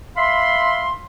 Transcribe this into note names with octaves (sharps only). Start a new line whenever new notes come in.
E5 F5 B5 C6